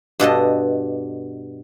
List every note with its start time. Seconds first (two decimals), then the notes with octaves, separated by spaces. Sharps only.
0.20 G2 B2 A4 D#5